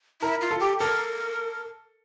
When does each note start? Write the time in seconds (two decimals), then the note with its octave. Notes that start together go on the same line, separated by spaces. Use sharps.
0.22 E4 A#4
0.41 F4
0.51 A4
0.60 G4
0.79 A4 A#4